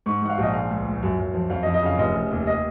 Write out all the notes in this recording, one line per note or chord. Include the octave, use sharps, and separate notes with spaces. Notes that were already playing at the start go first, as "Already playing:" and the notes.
G#2 C#6
G#2 F#5
F5
A#1 D#5
G#3 F5
C#2
C#2
F#2
F#2
F3
F2 F5
D#5
F2
D#5
C#3 F5
F1 D#5
F1
D#2
D#5